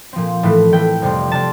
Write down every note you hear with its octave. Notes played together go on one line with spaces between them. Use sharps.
A#2 F3 C4
A2 E3 A3
A2 E3 A3 G5
F2 C3 G3 C4
C3 G3 C4 A5